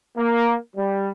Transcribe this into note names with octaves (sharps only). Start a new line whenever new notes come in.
A#3
G3